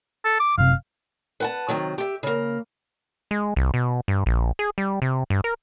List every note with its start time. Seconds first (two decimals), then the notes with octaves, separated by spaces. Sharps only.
0.25 A4
0.40 D6
0.58 F#1 C3 F5
1.40 B4 F#5 A5
1.68 C3 D#3 F#3
1.98 G4 E5
2.23 C#3 A#3
3.31 G#3
3.56 C2
3.74 B2
4.08 G2
4.26 A#1
4.59 G#4
4.78 G3
5.02 C3
5.30 G2
5.44 A#4